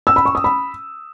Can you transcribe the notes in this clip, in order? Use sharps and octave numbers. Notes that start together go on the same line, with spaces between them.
E6
B5
C#6
D#6
B5